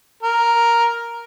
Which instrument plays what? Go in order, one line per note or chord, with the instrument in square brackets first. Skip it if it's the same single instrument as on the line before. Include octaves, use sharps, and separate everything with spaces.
[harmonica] A#4